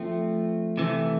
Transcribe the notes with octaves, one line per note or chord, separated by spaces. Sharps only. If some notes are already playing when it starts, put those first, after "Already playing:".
Already playing: F3 A3 C4
C3 E3 A3